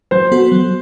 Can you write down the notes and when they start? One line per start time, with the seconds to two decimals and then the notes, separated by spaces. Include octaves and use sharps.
0.11 F#3 C5
0.32 B3 F#4 A4
0.52 F#3